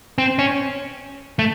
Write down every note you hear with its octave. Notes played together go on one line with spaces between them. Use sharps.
C4
C#4
A3